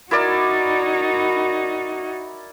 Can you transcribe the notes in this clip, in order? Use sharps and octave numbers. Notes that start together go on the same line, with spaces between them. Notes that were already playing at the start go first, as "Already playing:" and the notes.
D#4 E4 F#4 A#4 D5